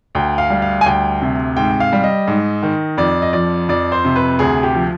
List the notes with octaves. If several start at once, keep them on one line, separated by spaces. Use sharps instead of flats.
D2 G5
F5
G3
F5
G#5
D2 G5
C3
G#2 G5
F5
G3
D#5
G#2
D#3
F2 D5
D#5
F3 D5
F2 D5
C5
C3
B4
D2 G#4
G4
F3